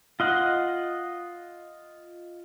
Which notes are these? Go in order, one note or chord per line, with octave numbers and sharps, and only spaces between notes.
F4 D#5 F#5